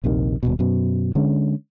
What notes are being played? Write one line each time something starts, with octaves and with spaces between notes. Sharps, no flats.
A#1 D#2 C3 D#3
D#1 B1 B2
F#2 B2
D3 G#3 C#4